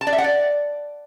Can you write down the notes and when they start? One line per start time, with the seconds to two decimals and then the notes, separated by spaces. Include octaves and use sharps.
0.01 A5
0.07 D5
0.13 E5
0.18 F#5
0.24 D5